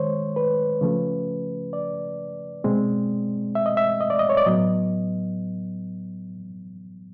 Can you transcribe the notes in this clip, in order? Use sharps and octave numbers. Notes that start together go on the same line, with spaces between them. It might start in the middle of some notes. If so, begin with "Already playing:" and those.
Already playing: D#3 G#3 C5 C#5
B4
C#3 F3 A3 C#4
D5
B2 G#3 C4
E5
D#5
E5
D#5
D5
D#5
C#5
D5
A2 F#3 B3 D#5